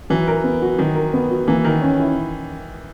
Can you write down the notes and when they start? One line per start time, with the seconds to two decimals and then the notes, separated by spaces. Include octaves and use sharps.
0.10 E3 F#3
0.28 A#4
0.44 B3
0.62 F#4
0.78 D#3 F#3
0.96 A#4
1.13 B3
1.30 F#4
1.48 E3 A#3
1.65 D#3 A#4
1.82 C#4
2.00 E4